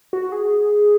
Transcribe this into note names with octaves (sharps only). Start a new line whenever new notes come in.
F#4
G#4